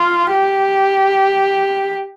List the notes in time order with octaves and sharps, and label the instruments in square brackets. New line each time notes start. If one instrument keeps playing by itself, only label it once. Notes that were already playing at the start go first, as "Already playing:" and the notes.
Already playing: [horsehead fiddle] F4
G4